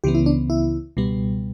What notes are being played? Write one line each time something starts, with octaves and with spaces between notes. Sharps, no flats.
C#2 C#3 E3 B3 G4
E4
D4
E4
C#2 B2 G3 B3